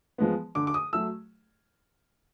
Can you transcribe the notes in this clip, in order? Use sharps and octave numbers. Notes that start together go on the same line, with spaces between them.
F3 G#3 B3
D3 D6
D6
D#6
F#3 A3 E6